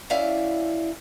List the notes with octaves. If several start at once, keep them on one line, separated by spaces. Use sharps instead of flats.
F#2 C#4 E4 D5 E5 F5